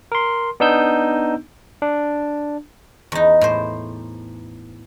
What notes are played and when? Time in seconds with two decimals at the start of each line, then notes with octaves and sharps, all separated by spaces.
0.12 A#4 C6
0.60 B3 D4 D#4 E6 G6
1.82 D4
3.12 E2 D#4
3.41 A2 C5